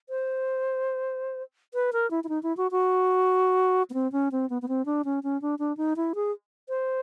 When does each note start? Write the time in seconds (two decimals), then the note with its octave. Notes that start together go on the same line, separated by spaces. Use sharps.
0.09 C5
1.74 B4
1.93 A#4
2.11 E4
2.24 E4
2.29 D#4
2.43 E4
2.57 F#4
2.71 F#4
3.90 B3
3.94 C4
4.12 C#4
4.32 C4
4.50 B3
4.62 B3
4.68 C4
4.86 D4
5.05 C#4
5.23 C#4
5.42 D4
5.59 D4
5.77 D#4
5.96 E4
6.15 G#4
6.69 C5